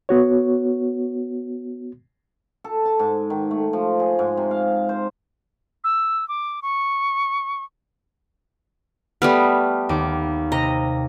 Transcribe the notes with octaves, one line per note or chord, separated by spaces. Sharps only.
B3 F#4 C#5
A4
A5
G#2
D#3
A3
F3
G#4
G#2
C3
F5
C5
E6
D6
C#6
G3 A3 B3 F6
D#2 D6
C3 D#5 A#5